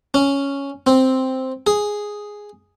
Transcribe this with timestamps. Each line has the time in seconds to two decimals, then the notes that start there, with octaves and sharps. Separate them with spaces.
0.14 C#4
0.87 C4
1.67 G#4